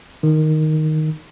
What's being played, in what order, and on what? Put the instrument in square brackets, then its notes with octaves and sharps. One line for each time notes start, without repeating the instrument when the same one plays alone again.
[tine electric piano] D#3